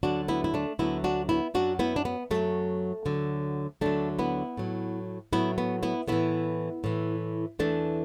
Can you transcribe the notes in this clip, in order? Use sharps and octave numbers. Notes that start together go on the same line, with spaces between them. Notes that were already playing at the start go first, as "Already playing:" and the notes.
D2 D3 F#3 D4 F#4
B3 E4
E4
A3 D4
D2 D3 F#3 B3 E4
D4 F#4
B3 E4
F#2 F#3 D4 F#4
B3 E4
D4
B3
F#2 F#3 A3
D2 D3 F#3
D2 D3 F#3 A3 D4
B3 E4
A2 F#3
A2 F#3 B3 E4
B3
B3 E4
A2 E3 B3 E4
A2 E3
E2 E3 A3 D4